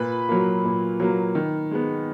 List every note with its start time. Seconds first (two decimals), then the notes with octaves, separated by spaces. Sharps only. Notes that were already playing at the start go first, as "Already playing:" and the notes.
Already playing: A#2 B4 B5
0.29 F#3 A#3
0.65 A#2
1.00 F#3 A#3
1.35 D#3
1.71 G#3 B3